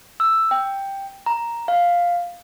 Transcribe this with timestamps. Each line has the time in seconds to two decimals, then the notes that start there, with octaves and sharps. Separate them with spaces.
0.20 E6
0.51 G5
1.26 A#5
1.68 F5